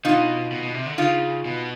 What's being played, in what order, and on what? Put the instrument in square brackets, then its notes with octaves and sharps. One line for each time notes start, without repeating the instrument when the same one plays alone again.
[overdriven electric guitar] B2 [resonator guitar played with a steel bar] D#4 F4
[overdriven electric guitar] B2
B2
C3
D3
[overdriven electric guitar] C#3 [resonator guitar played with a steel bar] D#4 F4
[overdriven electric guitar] B2